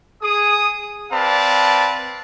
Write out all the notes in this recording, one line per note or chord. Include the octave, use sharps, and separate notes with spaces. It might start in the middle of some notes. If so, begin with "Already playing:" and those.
G#4 D#6
C4 B4 D5 F5 A5